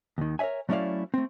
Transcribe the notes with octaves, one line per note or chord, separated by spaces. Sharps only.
D#2 D#3
A#4 C#5 D5 E5 G#5
F#3 A3 C#4 E4 D5 F5
A3 C4